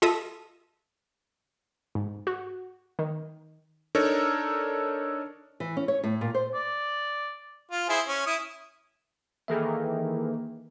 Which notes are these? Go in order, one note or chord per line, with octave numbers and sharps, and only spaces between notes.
F4 A4 D#5 E5 D#6
G#2
F#4
D#3
D4 D#4 A4 A#4 C#5
E3
C#4
C#5
A2
A#2
C5
D5
F4
E4 G#4 C5
C#4
E4 D#6
D#3 E3 A#3 G#4 A4 E5